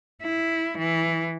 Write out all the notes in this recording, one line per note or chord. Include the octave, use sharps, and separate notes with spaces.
E4
E3